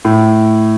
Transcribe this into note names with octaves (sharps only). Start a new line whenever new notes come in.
A2